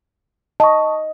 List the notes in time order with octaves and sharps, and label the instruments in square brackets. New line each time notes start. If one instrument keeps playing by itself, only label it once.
[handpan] D#5 [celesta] A5 C#6